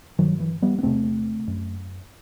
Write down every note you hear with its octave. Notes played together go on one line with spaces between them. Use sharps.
G2 D#3 F#3
E3
G3 B3
B3
E2 C3 A3 C4
F#2